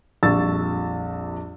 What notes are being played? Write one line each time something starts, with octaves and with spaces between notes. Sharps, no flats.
A#1 F2 G3 C#6 E6 A6